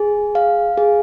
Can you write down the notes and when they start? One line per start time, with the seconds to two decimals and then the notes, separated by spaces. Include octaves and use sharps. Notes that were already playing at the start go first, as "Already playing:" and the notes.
Already playing: G#4
0.35 F5
0.77 G#4